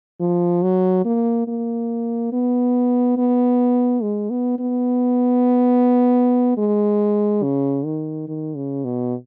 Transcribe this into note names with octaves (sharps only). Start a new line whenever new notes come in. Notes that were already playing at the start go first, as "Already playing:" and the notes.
F3
F#3
A#3
A#3
B3
B3
G#3
B3
B3
G#3
C#3
D#3
D#3
C#3
B2